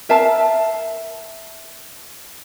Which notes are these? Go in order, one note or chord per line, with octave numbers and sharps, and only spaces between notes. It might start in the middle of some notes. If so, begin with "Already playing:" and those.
A#4 E5 F5 A5